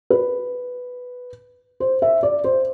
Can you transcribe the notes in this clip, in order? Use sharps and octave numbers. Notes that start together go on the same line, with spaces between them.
B4
C5
E5
D5
C5